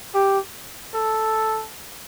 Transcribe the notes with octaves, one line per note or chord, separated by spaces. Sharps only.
G4
A4